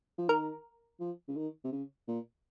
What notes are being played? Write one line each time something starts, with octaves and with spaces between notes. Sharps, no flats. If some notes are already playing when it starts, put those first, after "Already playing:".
F3
D#3 A#4
F3
C#3
D#3
C3
C#3
A#2